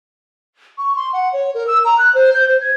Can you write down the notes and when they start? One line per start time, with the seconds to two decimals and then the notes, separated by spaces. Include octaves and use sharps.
0.78 C#6
0.96 C6
1.13 F#5
1.33 C#5
1.54 A#4
1.67 E6
1.85 A#5
1.98 F#6
2.15 C5
2.34 G6
2.49 C5
2.61 G#6